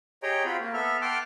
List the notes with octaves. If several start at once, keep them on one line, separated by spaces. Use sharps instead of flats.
G4 G#4 C#5 D#5 G5 A#5
C4 F4 F#4 B5
A#3
B3 A4 E5 F6
F#5 G5 A5 C6 D6 F6